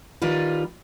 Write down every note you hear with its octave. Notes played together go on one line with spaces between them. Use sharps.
D#3 G3 F4 B4